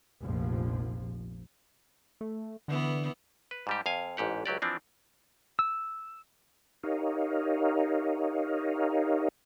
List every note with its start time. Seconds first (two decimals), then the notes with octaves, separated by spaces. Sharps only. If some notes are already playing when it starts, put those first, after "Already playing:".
0.21 F1 A#1 F3
2.21 A3
2.68 D3 E3 B3
3.51 B4
3.67 G#2 G3 G4
3.86 F2 F5 G#5
4.17 A1 G#2 G4 F#5
4.46 C#2 F#3 G4 D5
4.62 E3 F3 C4 D4
5.59 E6
6.83 D#4 G4 A#4 C#5 D#5 F5